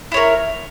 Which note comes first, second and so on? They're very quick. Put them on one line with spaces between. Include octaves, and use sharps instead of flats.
E4 C#5 A#4